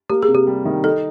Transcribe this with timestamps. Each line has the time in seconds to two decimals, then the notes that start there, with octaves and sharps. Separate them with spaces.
0.10 A#3 G4
0.23 G#4
0.28 C3
0.35 G4
0.47 G3
0.65 D#3
0.84 D#4 A4